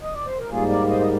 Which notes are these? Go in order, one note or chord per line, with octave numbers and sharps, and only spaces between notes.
D#5
D5
C5
A#4
G#2 G3 A#3 F4 G#4
A#4 D5
C5 D#5
D#5